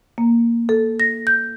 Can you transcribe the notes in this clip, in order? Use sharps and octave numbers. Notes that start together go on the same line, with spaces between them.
A#3
A4
A#6
G6